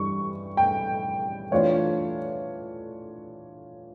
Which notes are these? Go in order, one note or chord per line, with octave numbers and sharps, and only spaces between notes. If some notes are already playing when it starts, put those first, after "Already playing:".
Already playing: G2 E3 G3 C#6
G5
E3 A3 D4 F4 C#5